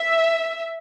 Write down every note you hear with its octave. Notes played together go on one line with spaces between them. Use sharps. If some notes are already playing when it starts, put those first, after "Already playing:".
Already playing: E5